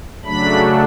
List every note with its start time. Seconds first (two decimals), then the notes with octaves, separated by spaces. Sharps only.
0.24 C#3 F#3 A3 D4 B5